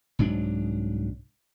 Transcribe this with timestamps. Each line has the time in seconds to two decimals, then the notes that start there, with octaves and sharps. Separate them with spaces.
0.19 C2 G#2 F#3 D4